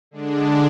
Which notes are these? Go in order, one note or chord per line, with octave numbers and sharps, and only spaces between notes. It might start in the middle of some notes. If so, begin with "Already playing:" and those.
D3 G#3 D4